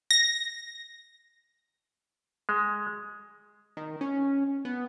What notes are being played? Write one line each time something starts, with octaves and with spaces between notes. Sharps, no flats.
A#6
G#3
D#3
C#4
B3